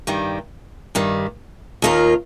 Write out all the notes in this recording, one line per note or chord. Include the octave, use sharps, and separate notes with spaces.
G2 D#3 G3
G2 D#3 G3
D#2 D#3 A#3 F4